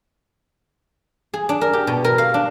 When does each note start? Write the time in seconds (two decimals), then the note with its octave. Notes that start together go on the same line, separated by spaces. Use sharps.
1.34 G#4
1.49 D4
1.61 A#4
1.73 G4
1.87 B2
2.04 A#4
2.18 F5
2.34 D4